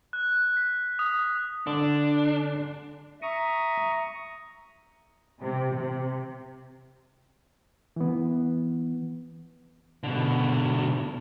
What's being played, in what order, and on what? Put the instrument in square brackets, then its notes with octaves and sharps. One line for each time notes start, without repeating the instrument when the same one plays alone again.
[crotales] F#6
B6
D#6
[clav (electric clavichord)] D3 [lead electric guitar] D4
[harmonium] E5 [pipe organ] A#5 C#6 D#6
[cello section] C3
C3
[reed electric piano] E3 B3
[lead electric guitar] B2 D3